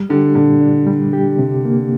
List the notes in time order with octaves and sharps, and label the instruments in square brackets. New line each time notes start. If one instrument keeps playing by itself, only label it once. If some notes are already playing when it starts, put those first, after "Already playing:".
Already playing: [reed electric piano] G3
[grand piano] D3 [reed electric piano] G4
[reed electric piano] A#2 [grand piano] D3
[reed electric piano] D4
G3
G4
C3
A#3